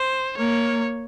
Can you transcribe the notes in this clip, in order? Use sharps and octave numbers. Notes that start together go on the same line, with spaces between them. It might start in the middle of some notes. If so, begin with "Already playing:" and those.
Already playing: C5
A#3 C#5